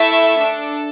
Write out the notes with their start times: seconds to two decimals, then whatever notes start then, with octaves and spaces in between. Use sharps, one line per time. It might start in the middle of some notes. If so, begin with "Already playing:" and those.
Already playing: A3 E4 A4 E5
0.39 D4 A4